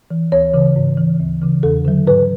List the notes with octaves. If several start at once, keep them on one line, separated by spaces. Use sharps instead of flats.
E3
D2 C#5
C#3 E3
G#2
E3
D2
C#3 E3
E2 A4
D3 F#3
G#2 B4